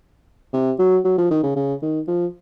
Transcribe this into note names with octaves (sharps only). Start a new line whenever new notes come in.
C3
F#3
F#3
F3
D#3
C#3
C#3
D#3
F3